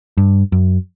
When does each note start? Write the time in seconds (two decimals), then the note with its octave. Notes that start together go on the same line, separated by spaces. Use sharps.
0.17 G2
0.52 F#2